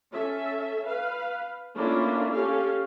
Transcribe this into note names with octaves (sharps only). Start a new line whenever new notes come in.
C#4 A4 E5
B4 F5
A3 A#3 C#4 D4 E4 F4
C#4 G4 A4 F5